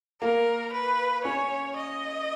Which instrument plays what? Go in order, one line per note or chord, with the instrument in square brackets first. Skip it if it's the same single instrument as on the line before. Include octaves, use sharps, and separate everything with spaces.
[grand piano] A#3 [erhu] A#4
[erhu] B4
[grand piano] C#4 [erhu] C#5
[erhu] D#5